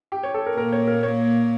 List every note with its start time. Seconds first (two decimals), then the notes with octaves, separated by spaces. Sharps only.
0.12 G4
0.23 C#5
0.34 A4
0.46 A#4
0.57 A#2 A#3 A#4
0.72 C#5
0.87 A#4
1.03 C#5